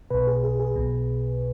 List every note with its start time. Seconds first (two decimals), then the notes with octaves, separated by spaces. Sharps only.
0.10 B1 B2 B4
0.27 G#4
0.44 G#4
0.60 G#4
0.76 B1 B2